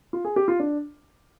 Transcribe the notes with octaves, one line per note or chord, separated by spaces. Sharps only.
F4
G#4
G4
F4
D4